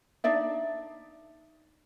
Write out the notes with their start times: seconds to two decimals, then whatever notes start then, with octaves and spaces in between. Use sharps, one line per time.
0.24 D4 D#4 D5 E5